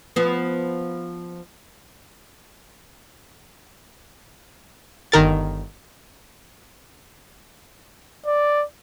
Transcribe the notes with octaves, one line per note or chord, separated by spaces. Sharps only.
F3 B3
G1 D#3 A#4 A6
D5